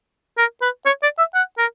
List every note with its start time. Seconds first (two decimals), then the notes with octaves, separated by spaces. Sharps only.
0.38 A#4
0.62 B4
0.86 C#5
1.03 D5
1.19 E5
1.35 F#5
1.58 A#4